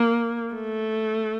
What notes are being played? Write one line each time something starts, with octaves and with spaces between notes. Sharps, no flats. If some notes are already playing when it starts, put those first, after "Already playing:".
Already playing: A#3
A3